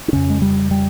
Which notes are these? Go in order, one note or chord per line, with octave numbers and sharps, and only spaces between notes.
D4
F2 C#3 C#4
G#3
G3
G3